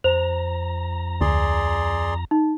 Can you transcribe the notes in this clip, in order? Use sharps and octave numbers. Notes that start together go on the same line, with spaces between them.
F2 C5 A#5
D2 G#4 D5 C6
D#4